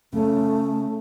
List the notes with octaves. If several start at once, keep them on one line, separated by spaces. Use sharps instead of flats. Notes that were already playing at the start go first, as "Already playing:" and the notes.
C#3 A3 C#4